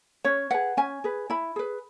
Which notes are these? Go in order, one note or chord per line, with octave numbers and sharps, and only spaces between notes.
C#4 C#5
G#4 B4 F#5
C#4 G#5
G#4 B4
E4 B5
G#4 B4